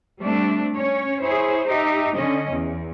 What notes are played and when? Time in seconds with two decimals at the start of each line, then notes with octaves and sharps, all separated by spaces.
0.21 G3 A3 C4 D4
0.74 C#4 C#5
1.20 E4 G#4 C5 C#5
1.67 D#4 G4 E5
2.11 D3 C#4 D#5
2.49 E2